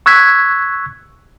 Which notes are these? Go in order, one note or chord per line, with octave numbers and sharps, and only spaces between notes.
C#6 E6 F#6 G#6 B6